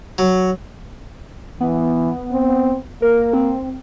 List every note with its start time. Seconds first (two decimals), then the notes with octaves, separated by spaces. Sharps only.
0.18 F#3
1.60 E3 B3
2.32 C4
3.02 A#3 A#4
3.34 C4